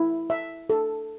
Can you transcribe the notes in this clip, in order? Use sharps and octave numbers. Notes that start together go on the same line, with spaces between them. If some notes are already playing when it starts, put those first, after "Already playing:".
Already playing: E4
E5
A4